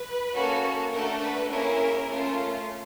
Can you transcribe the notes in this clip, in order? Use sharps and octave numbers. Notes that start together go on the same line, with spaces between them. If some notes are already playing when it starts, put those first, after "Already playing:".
Already playing: B4
A#3 C#4 F#4 A4
A3 D4 F#4 A4 A#4
B4
A#3 C#4 E4 G#4 A#4
A3 C#4 F4